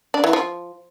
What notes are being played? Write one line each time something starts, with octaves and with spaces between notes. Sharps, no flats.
D4
E3
F3